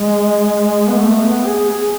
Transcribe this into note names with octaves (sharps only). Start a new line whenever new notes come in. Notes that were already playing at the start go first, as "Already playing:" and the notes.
Already playing: G#3
B3
A3
B3
G#4
G#4